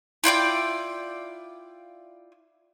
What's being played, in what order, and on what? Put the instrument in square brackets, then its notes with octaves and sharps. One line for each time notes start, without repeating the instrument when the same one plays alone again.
[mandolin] E4 F4 D5 G5